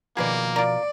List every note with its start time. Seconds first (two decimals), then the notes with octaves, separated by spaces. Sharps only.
0.17 B2 D#3 F3 A#3 F#4 G#4 B4 D5
0.56 F4 A#4 D5